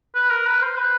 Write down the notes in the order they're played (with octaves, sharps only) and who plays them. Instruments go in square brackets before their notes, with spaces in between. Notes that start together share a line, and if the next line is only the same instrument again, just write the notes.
[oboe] B4
A#4
B4
C5
B4